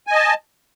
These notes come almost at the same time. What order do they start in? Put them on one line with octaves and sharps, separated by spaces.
G#5 D#5 A5